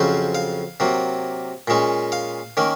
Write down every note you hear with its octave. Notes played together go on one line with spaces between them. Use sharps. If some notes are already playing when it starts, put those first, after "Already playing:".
Already playing: F2 C#3 F#3 C#4 C5
F5
C3 F#3 A#3
A#2 G#3 C#4
F5
D#3 A#3 C#4